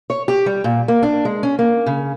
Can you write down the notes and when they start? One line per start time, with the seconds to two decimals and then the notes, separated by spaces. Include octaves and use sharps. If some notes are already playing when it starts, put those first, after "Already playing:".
0.10 C#5
0.28 G4
0.46 G3
0.64 A#2
0.88 A#3
1.03 D4
1.25 G#3
1.43 C#4
1.59 A#3
1.86 C#3